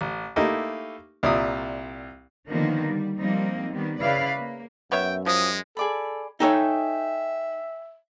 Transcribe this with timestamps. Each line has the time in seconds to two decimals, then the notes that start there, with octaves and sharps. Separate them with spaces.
0.01 A1
0.36 A3 A#3 D#4 E4 G4
1.23 C2 A#2 D5 E5 D#6
2.49 D3 D#3 F3 A#3 B3 D#4
2.85 G3
3.18 F3 G3 A#3 C4 D#4
3.72 D#3 G3 B3
4.00 C#3 E4 B4 D5 F5
4.36 A#3
4.92 F#2 B3 C#5 E5 G5
5.26 F3 G#3 D#6
5.77 G#4 A4 D5 B5
6.40 D#4 A4 C#5 D#5 E5 G5 G#5